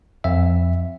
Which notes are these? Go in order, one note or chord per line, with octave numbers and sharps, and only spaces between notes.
F2 E5